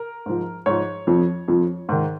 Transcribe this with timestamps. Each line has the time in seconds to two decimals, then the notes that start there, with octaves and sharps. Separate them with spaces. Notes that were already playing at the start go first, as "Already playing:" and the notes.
Already playing: A#4
0.26 G#2 F3
0.66 G#2 F3 C#5
1.07 F2 F3
1.48 F2 F3
1.89 G#2 D#3